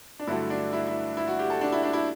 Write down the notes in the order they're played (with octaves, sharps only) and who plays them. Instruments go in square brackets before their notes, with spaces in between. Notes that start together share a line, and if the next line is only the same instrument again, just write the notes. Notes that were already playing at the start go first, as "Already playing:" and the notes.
[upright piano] D4
G2 D3 F#3 A3 E4
D4
E4
E4
E4
F#4
G4
A4
D4
E4
D4
E4